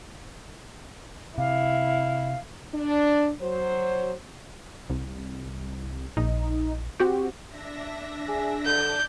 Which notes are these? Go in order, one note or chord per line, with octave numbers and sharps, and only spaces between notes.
C3 E4 F5
D4
F#3 C5
C2
A#1 D#4
C4 F#4 G4
D4 E5 A#6
G#4
D3 D5 A5 G6